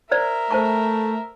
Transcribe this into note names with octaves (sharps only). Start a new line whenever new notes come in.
A#4 C5 D5 E5
A3 C5 A5 C#6